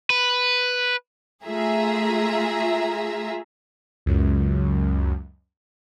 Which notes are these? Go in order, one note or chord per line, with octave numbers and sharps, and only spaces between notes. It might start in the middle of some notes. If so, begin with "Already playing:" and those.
B4
A3 F4 G#4 E5 A#5
C#2 F#2